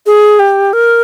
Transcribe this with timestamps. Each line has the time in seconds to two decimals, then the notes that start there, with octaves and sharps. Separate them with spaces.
0.06 G#4
0.39 G4
0.73 A#4